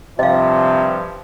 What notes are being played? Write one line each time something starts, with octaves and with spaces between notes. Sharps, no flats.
G2 C3 F3 D#5 F5